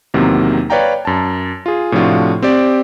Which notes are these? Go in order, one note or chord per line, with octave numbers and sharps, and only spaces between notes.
E2 C3 D#3 F#3 A#3
B4 C#5 D5 F5 G5 A#5
F#2 A5
F4 G#4
A2 C3 F3 D4 F4 F#4
C4 G4 D5